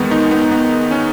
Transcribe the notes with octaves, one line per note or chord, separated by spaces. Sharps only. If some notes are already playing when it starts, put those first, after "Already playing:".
Already playing: E2 D#3 G#3 B3
D#4
B3
B3
C#4